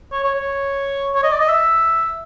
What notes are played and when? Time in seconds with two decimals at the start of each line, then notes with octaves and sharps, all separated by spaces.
0.12 C#5
0.24 C#5
0.35 C#5
1.15 C#5
1.24 D#5
1.32 D5
1.40 D#5
1.49 E5